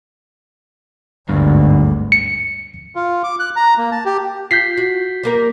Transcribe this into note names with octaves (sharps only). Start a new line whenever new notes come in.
G#1 D2 G2 D3
C#7
F4
D6
F#6
A#5
A#3
A5
G4
F4 G6 B6 C7
F#4
G3 A#3 A#4